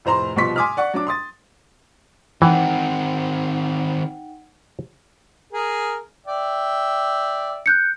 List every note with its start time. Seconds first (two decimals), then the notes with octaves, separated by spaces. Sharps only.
0.05 F1 A2 C5 A#5 C6
0.36 C2 B2 F3 C6 C#6 B6
0.56 G#5 C6 D6 D#6 F6
0.77 D5 F#5 C#6
0.94 F#3 D4 D6
1.07 C6 D#6 A6
2.42 D#3 E3 C4 D#4 F#5 G5
5.53 G#4 A#4
6.26 D5 E5 G5
7.66 F#6 G6 C#7